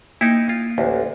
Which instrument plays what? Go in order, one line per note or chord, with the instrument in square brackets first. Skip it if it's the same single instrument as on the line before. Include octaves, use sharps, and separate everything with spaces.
[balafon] A#3 [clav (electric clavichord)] D#4 E4
[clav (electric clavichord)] F4
A1 D2